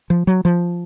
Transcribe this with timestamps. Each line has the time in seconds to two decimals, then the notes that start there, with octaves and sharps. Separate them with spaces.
0.10 F3
0.27 F#3
0.45 F3